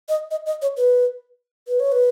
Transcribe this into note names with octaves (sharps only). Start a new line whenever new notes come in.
D#5
D#5
D#5
C#5
B4
B4
C#5
B4